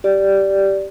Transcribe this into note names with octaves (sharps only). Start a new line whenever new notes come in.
G4 D5